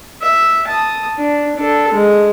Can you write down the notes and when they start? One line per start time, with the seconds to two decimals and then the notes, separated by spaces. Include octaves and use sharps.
0.22 E5
0.68 A5 D#6
1.18 D4
1.56 D4 A4
1.93 G#3